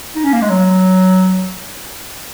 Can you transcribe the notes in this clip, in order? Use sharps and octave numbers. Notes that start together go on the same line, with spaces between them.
D#4
C#4
A#3
G#3
F#3